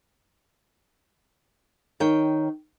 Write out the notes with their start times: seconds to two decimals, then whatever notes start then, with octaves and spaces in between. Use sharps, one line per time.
2.00 D#3 C#5 G5